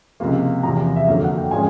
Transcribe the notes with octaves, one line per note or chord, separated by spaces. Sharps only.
C#2 C3 F3 A#3
E2 C3 F3 A#5
E5
F2 D3 F#3 A#3 F5
F#5
G5
A#2 F3 G#3 C#4 G#5